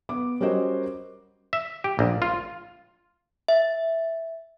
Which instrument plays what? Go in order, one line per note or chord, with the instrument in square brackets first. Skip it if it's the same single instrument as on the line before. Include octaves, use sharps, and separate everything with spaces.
[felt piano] B3 D6
G3 C#4 F#4 A#4 C5 D#5
[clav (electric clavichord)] E5
G4
A#1
F4
[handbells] E5